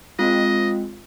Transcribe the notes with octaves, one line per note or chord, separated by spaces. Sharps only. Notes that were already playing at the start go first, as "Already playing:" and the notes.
G#3 C4 F4 D#5